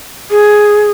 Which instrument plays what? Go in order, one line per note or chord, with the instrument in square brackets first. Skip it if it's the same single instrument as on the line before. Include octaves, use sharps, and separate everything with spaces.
[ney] G#4